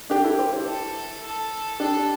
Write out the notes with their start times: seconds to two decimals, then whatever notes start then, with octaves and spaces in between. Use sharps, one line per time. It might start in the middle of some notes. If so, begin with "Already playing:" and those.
0.10 D4 G4
0.24 E4 A4
0.38 G4 C5
0.52 E4
0.66 A4
1.24 A4
1.79 D4 G4 A4